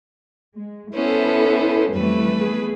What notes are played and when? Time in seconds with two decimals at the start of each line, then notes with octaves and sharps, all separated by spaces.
0.56 G#3
0.94 B3 C#4 E4 A4 B4 C5
1.92 F2 E3 G3 A3 B4
2.37 B3 G#4